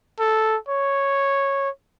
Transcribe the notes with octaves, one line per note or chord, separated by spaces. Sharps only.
A4
C#5